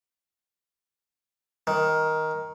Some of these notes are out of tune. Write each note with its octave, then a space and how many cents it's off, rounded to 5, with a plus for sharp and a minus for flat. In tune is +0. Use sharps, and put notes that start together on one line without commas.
D#3 +10